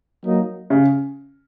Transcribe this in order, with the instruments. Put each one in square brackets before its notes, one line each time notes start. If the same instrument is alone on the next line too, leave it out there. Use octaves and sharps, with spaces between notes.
[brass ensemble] F#3 A#3 D#4
[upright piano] C#3